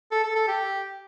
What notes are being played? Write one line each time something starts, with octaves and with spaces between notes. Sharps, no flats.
A4
A4
A4
G4